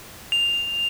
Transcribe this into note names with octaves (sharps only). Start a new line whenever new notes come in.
F7